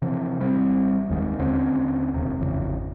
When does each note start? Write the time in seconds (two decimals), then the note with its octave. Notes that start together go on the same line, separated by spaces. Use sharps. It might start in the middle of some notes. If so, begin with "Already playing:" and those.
0.02 C3 E3 F3
0.40 G#1 G3 C4
1.09 F1 D#2 D#3 G#3
1.38 D#2 D3 C4 C#4
2.14 E1 D#2 C3
2.40 G#1 F2 C#3 E3